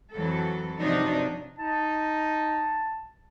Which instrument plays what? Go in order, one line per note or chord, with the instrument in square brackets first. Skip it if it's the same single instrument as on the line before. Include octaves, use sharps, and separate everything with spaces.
[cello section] F2 E3 F#3 A4
G2 C3 F3 F#3 D4 D#4
[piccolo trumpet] D#4 [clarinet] A5